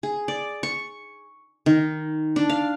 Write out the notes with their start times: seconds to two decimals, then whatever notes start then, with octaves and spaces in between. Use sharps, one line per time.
0.03 G#4
0.28 D5
0.63 C#6
1.66 D#3
2.36 D4
2.50 F5